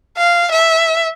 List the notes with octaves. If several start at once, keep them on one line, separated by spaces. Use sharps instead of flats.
F5
E5